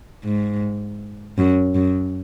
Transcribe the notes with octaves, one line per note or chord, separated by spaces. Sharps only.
G#2
F#2
F#2